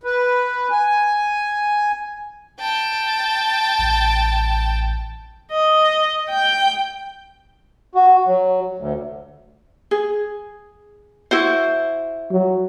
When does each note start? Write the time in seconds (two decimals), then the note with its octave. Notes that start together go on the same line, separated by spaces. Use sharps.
0.03 B4
0.71 G#5
2.60 G5 A5
3.79 A1
5.52 D#5
6.30 G5
7.95 F#4
8.26 F#3
8.78 D2
9.91 G#4
11.31 E4 F#4 C5
12.31 F#3